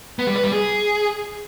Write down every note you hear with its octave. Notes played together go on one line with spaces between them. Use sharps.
B3
G3
B4
G3
G#4